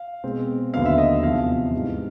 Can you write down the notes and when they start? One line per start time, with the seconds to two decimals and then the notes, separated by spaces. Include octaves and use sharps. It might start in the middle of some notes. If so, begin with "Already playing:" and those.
Already playing: F5
0.24 B2 G#3 C4
0.74 D#2 D3 F#3 B3 F5
0.85 E5
0.98 D#5
1.23 E2 C3 F3 F5
1.73 G#2 E3 G3